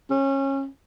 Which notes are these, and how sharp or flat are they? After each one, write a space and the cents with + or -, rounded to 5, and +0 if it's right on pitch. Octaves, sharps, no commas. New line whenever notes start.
C#4 -25